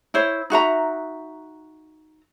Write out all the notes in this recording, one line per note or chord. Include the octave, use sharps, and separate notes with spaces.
E4 C5 C#5
D#4 F#4 E5 A#5